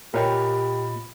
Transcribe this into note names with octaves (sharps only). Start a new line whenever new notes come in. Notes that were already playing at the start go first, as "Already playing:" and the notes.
A#2 F4 G4 A#4 C#5 D#5 G5 B5